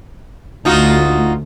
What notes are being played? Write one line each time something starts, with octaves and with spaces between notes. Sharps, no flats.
D2 D#4 F4 F#4